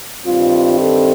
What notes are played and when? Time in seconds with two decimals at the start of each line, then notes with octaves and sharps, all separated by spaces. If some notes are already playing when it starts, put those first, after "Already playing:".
0.25 G2 D#3 G3 C4 F4
0.79 A4